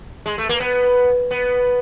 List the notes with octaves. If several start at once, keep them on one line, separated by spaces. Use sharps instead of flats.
G#3
A3
A#3
B3
B3